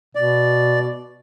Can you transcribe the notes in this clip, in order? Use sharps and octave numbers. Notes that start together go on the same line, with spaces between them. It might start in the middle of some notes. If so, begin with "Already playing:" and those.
B2 D5